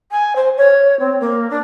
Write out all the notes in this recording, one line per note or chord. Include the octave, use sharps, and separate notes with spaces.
G#5
C5
C#5
C4
A#3
D4